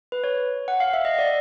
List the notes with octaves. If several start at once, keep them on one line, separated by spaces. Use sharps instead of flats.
B4
C#5
F#5
F5
E5
D#5
D5